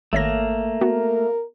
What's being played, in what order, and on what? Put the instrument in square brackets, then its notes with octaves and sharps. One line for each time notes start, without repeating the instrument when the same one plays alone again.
[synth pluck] G#1 C#5 A#6 [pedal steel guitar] A3 A#3
[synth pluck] B3 F#4 [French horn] A#4